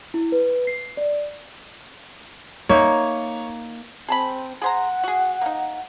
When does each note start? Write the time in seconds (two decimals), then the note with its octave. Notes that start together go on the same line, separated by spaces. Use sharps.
0.14 E4
0.32 B4
0.67 C7
0.97 D5
2.69 A#3 D#4 C#5 E5
4.09 C4 G#4 A5 B5
4.62 G#4 C5 F#5 A#5
5.04 F#4 G#4
5.41 A#3 D#4